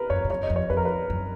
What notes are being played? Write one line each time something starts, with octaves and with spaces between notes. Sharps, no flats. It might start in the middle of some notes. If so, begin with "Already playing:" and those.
Already playing: A#4 B4
F#2 C#5
G#2
F#2 C#5
D#5
F2
C#5
F2 B4
A#4
B4
F#2